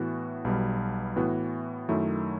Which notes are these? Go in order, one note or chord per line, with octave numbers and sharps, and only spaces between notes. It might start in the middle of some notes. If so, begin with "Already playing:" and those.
Already playing: A2 E3 B3 F#4
B1 B2 G3
A2 E3 B3 F#4
F#2 D#3 F#3 A3 E4